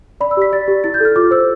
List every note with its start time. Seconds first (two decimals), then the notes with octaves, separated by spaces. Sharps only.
0.21 D5 B5
0.31 E6
0.37 G4 B6
0.52 D5 A6
0.68 G4
0.84 E4 A6
0.94 G6
1.00 A4 F6
1.16 F4 D6
1.31 C5 E6